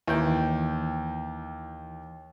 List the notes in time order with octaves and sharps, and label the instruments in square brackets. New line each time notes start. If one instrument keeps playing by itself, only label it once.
[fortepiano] D#2 [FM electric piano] E3 G5